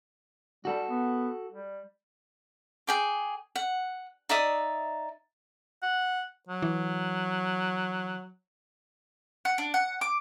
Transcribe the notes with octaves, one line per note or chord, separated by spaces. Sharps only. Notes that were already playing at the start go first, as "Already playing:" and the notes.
G3 F#4 A4
B3
G3
G#4 G5 D6
F#5
D#4 D5 E5 D#6
F#5
F#3
E3
F#5
D4
F#5
D6